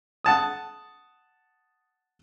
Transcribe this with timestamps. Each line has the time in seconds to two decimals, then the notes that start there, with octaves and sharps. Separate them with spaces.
0.24 F#5 A5 D#6